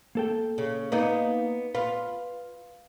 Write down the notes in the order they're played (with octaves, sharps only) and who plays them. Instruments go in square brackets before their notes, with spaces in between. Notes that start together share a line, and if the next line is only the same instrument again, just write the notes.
[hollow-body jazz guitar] A#3 A4 G5
[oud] C#3
[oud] A#3 D#4 [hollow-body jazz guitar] B3 B4
[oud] F4 [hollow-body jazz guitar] B4